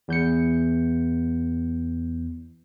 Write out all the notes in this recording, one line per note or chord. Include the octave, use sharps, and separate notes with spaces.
E2 G6 C#7